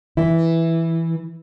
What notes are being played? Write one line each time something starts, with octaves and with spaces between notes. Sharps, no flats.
E3 E4